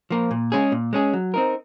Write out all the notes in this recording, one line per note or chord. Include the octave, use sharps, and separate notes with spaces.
F3 A#3
A#2
G#3 C#4 G#4
A#2
G#3 C#4 G#4
F#3
C4 D#4 A#4